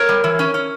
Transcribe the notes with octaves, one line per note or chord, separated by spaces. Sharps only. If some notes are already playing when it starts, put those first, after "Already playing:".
Already playing: A#4 C#5
G3
E3
C#4
C#4